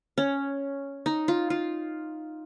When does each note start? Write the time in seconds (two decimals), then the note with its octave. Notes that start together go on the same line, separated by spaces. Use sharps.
0.18 C#4
1.06 D#4
1.28 F4
1.50 F4